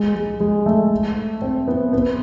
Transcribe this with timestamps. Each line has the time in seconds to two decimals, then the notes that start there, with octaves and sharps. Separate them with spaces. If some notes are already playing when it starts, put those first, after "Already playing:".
Already playing: G#3
0.15 G#3
0.40 G#3
0.66 A3
1.42 C4
1.68 B3
1.93 B3